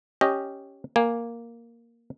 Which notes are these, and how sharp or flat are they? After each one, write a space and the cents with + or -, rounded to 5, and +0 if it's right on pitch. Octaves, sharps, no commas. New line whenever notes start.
C#4 +0 G4 +0 D#5 +0
A#3 +0 G#5 -20